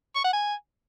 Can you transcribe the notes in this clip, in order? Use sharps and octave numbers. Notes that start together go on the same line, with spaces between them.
C#6
F#5
G#5